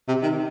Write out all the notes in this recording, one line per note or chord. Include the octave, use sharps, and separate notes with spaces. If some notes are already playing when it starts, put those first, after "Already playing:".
C3
D#3